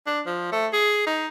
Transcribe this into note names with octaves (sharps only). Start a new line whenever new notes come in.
D4
F3
A3
G#4
D#4